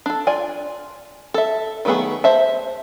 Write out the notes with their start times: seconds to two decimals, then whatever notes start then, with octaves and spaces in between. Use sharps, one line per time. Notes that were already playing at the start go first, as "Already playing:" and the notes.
0.06 D4 A4
0.27 F4 D5 G#5
1.34 A4 E5
1.85 D#3 F#3 A3 B3 G#4
2.24 C5 E5 A5